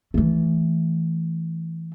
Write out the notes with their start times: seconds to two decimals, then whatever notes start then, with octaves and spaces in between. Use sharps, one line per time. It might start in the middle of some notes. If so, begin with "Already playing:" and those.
0.14 E3 A3